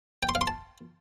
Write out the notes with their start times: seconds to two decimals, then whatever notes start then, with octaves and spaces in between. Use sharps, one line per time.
0.23 G5
0.29 C6
0.35 F5
0.41 C6
0.47 A5